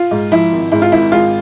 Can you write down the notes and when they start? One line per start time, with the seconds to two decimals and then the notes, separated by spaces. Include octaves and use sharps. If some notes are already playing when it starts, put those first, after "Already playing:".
Already playing: F4
0.11 G#2
0.32 F3 E4
0.52 G#1
0.72 G#2 E4
0.82 F4
0.92 G#1 E4
1.12 G#3 F4